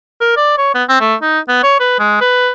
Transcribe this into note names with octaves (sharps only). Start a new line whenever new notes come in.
A#4
D5
C#5
B3
C4
A3
D#4
B3
C#5
B4
G#3
B4